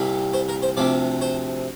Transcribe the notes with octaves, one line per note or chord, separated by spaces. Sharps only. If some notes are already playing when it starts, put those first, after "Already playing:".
Already playing: C2 A#2 G3
C5
A#4
C5
D2 C3 F3 D5
C5